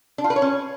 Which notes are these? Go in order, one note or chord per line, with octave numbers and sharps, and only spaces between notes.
D4
F4
B4
C#5
C#4